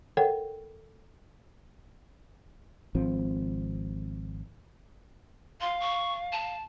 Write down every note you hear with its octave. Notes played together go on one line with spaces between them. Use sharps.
A4 A#4 C#5 F#5 G5
G#1 F3 C4
F5 C6
C#6
A5